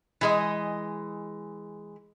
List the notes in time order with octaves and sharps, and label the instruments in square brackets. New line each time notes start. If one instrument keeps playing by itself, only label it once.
[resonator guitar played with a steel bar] E3 G#3 D#5